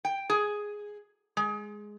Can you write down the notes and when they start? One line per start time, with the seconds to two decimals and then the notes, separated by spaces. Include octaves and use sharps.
0.05 G5
0.30 G#4
1.37 G#3